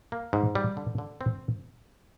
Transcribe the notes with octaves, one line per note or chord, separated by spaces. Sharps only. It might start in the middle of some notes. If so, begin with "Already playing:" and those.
A#3
G#2
G3
D3
D3
C4